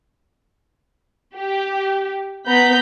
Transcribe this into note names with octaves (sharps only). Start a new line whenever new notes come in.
G4
B3 A#5 B5 G6 B6